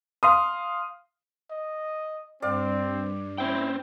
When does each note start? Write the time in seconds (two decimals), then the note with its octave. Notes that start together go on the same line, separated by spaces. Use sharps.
0.23 F5 C6 D#6
1.51 D#5
2.42 G2 C4 D5 F5
3.38 C#4 E4 C5 G5